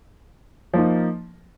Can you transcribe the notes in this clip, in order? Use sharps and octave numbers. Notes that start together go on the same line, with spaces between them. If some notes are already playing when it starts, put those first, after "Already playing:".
F3 A#3 D#4